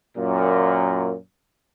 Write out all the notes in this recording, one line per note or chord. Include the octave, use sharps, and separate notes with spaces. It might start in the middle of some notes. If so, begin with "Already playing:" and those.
F#2 A#2